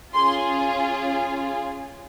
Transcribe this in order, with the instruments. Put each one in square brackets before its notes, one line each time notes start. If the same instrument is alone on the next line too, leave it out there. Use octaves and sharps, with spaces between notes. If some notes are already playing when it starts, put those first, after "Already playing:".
[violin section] C#4 F4 G#4 C6